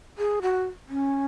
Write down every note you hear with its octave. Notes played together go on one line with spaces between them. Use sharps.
G#4
F#4
C#4